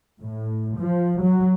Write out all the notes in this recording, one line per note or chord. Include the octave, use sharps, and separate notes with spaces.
A2
F3
F#3